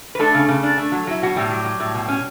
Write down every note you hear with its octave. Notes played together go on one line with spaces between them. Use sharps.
B4
A3 D4 A4
C#3
C#3
D4
A3
F#3
F#3 E4
B2 F#4
A2 G3 G4
F#3
F#3
A2
B2
C#4